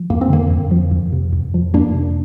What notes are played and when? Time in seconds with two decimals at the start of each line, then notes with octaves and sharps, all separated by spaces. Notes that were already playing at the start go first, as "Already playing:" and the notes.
Already playing: F3
0.10 F2 A#3
0.21 C4
0.29 D3 A#3
0.50 F2
0.71 F3
0.91 F2
1.12 C3
1.33 F2
1.54 F3
1.74 F2 A#3 D4
1.94 C3